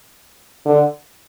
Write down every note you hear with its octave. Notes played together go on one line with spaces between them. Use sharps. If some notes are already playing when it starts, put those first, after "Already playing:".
D3